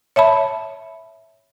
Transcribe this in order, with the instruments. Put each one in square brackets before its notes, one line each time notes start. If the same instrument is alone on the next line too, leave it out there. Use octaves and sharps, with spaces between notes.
[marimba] C#5 E5 A5 B5